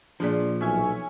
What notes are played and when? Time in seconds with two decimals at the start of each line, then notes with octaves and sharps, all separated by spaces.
0.20 A#2 F3 D4 G#4 D5
0.61 B1 C#4 E5 G#5